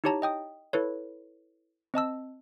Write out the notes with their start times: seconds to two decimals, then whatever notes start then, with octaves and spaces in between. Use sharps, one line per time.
0.04 D#4 E4 G4 C#5 A5 A#5
0.22 D#5 G5 D#6
0.73 E4 A4 B4 C#5
1.94 C4 D#5 A5 E6